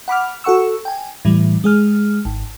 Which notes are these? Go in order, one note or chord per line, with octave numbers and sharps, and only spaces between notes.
F#5 B5 D6 F6
F#4 A4 F#5 C#6 E6
G5 G#5
A2 E3 G3
G#3 G#4 F6
G#1